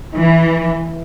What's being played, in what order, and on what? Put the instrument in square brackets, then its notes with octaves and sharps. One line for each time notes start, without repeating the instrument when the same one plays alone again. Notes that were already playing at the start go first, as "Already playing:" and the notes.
[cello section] E3